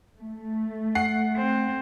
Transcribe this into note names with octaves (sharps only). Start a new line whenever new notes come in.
A3
F#5 C7
C4